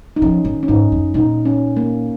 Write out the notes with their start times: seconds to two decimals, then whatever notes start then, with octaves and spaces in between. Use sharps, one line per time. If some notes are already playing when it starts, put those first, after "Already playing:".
0.16 D#4
0.22 F3 C#4
0.45 D#3
0.63 C#4
0.68 G#2 D#4
0.92 F#2
1.14 A#2 D#4
1.45 C#4
1.77 A#3